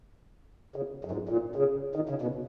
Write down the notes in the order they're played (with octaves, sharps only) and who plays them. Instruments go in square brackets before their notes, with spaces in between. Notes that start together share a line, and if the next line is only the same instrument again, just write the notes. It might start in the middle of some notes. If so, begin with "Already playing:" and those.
[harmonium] C#3
F#2
G#2
A#2
C#3
D#3
C#3
B2